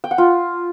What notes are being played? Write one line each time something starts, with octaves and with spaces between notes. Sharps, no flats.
G5
F#5
F4